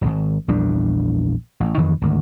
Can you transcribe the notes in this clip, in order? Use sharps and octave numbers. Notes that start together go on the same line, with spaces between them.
D#1 G#1
A#1 E2 G3 D4
A1
F2 D#3 E3
G#1 D2